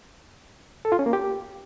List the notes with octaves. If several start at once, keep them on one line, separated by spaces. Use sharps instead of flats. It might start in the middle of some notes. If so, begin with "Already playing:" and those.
A4
F4
C#4
A#3
G4